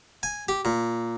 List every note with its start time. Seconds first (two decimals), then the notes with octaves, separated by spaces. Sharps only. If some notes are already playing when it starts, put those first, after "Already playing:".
0.23 G#5
0.49 G4
0.65 A#2